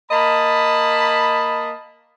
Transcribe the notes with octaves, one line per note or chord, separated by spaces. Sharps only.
A#3 D#5 A5 B5